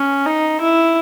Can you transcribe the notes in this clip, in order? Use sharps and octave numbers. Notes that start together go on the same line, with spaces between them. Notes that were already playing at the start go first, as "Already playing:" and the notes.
Already playing: C#4
D#4
E4